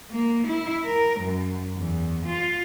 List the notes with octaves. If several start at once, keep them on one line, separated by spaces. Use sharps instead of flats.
A#3
E4
A#4
F#2
E2
F4